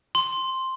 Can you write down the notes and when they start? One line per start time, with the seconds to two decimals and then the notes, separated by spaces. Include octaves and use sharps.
0.15 C6